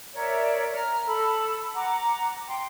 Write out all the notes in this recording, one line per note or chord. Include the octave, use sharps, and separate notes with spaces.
A#4 C#5 D5 E5
A#5 F6
A4 B5
F#5 A#5 D6
G5 C6